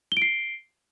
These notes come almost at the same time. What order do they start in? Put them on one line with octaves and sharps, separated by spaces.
G7 D7 C7